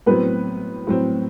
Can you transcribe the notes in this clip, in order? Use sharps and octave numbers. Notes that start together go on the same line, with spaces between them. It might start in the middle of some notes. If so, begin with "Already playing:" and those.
A2 F#3 B3 C4 B4
A2 F#3 C4